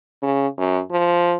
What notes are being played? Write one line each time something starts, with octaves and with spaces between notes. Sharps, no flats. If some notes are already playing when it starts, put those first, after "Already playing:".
C#3
F#2
F3